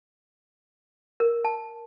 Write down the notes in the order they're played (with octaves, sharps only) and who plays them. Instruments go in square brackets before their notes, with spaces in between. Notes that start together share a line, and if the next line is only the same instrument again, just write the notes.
[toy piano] A#4
A5